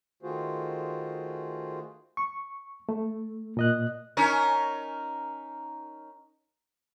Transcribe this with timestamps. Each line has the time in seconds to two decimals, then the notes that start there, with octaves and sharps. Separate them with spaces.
0.23 D#3 A3 F4 F#4 G#4 C5
2.17 C#6
2.89 A3
3.57 A#2 D#5 F#6
4.17 C#4 D#4 A#4